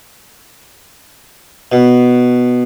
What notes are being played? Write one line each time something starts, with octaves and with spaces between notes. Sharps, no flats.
B2